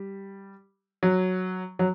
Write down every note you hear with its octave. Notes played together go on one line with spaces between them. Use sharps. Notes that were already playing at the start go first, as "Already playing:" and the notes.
Already playing: G3
F#3
F#3